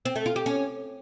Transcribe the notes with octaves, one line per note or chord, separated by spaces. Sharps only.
C4
A3
F4
G4
C#4